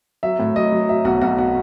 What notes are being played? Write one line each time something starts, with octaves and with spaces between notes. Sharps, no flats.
F#3 E5
A2
F#3 D#5
F#3
F#3 E5
B1 F#4
B1 F#4
F#4